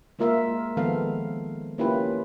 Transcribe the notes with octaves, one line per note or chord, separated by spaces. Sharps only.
G#3 A#3 F4 A#4 E5 F5
D#3 F3 G#3 B3 A4 F5
A#3 C#4 E4 F4 G4 B4